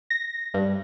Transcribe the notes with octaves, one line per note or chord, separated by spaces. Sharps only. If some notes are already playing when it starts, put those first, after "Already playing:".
A#6
G2